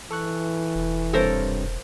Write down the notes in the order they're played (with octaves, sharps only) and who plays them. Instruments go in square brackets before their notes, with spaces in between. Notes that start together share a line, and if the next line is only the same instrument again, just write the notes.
[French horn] E3 [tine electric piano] A4 C#6 F#6
[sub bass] E1
[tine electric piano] G2 C3 C#5 [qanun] A4 A#4 C5